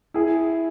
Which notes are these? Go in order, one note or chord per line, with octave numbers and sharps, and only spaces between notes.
E4 G#4